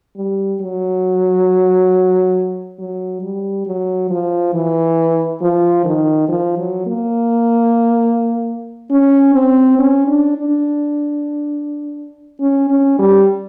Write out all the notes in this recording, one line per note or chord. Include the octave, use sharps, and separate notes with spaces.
G3
F#3
F#3
G3
F#3
F3
E3
F3
D#3
F3
F#3
A#3
C#4
C4
C#4
D4
D4
C#4
C#4
G3